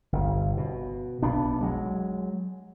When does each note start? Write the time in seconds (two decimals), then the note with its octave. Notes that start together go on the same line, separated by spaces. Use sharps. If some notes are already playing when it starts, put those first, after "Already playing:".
0.13 G1
0.57 B2
1.22 B1 B3 D4
1.61 F#3 G#3